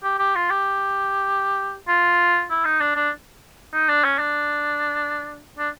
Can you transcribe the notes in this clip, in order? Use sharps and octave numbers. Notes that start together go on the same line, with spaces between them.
G4
G4
F4
G4
F4
E4
D#4
D4
D4
D#4
D4
C#4
D4
D4